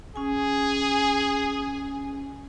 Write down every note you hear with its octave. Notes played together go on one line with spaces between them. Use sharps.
C#4 G#4 G#5